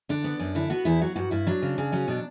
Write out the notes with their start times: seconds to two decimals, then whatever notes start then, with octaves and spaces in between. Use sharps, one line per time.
0.09 D3 D4
0.24 B3
0.39 F#2
0.55 D3 E4
0.70 B3 F#4
0.85 E2 E4
1.01 F#3 F#4
1.16 G2 F#4
1.31 G2 E4
1.47 F#3 D4
1.62 C#3
1.78 C#3
1.92 F#3 C#4
2.08 B2 D4